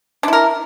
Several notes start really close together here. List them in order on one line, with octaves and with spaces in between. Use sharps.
D4 E4 A#4